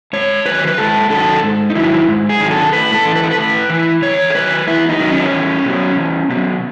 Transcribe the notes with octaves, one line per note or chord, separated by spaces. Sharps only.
G#2 C#5
D#3 F#3 B4
B4
G#2 A4
D#3 F#3 A4
G#2
D#4
D#3 F#3 E4
G#2
G#4
D#3 F#3
A4
A2 B4
A4
E3
B4
A4
B4
A2
E3
E2 C#5
A4
D#3 F#3 B4
E2 E4
D#4
D#3 F#3
C#4
E2
B2 F#3
E2
B2 F#3